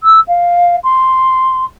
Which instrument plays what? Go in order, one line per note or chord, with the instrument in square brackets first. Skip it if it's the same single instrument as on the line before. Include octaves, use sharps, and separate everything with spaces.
[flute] E6
F5
C6